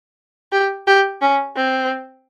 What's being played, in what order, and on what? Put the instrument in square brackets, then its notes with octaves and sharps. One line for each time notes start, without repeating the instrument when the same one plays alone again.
[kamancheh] G4
G4
C#4
C4